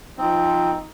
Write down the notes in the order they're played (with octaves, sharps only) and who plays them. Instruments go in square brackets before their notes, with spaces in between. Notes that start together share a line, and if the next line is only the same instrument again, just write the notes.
[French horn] F3 [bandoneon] C4 [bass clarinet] D#4